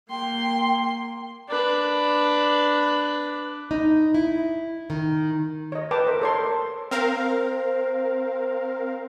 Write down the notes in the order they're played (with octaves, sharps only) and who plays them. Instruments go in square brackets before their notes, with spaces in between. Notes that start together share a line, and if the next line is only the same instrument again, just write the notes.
[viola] A#3 C6 [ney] G5
[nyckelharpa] D4 B4
[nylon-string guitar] D#4
E4
D#3
[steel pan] C#5 D#5
B4 G5 A5 D6
A#4 C5 D#5
A4 C#5 C6
[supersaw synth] C4 A#4 F5 [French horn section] C5